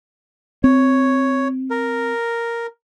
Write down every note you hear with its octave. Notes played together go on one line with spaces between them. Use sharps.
C4 C#5
A#4